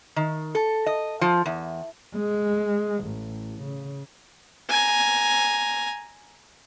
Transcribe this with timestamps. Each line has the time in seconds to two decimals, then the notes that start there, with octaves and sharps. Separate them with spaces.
0.16 D#3
0.55 A4
0.86 D#5
1.21 F3
1.46 E2
2.16 G#3
3.04 A1
3.61 C#3
4.70 G#5 A#5